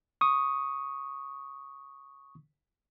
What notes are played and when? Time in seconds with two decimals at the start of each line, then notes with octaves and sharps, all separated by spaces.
0.21 C#6 D#6